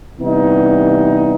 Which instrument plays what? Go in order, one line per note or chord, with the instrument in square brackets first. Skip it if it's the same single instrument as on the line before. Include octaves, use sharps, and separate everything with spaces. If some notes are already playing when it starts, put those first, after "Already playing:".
[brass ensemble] C3 E3 G3 B3 D#4